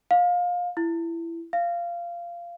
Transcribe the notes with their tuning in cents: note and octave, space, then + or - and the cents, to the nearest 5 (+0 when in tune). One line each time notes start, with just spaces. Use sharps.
F5 +25
E4 +20
F5 -15